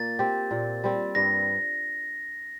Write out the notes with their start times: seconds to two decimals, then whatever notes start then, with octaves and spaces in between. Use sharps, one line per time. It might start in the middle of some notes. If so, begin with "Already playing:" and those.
Already playing: A#2 A#3 A6
0.19 C4 G4
0.51 A#2
0.84 G3 C4
1.15 G2 A#6